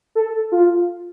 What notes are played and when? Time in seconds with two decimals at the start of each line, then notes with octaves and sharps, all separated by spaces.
0.15 A4
0.52 F4